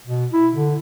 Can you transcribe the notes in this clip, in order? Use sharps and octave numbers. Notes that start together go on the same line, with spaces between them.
B2
E4
D3